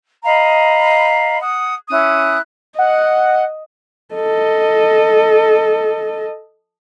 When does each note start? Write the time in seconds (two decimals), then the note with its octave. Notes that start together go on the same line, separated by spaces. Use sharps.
0.23 D#5 F5 A#5 B5
1.41 F#5 D#6
1.89 C#4 E4 D#6 F#6
2.79 D#5 F#5
4.15 A4 D#5